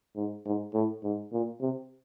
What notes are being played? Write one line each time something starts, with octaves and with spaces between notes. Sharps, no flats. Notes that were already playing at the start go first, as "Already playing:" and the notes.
G#2
G#2
A2
G#2
A#2
C3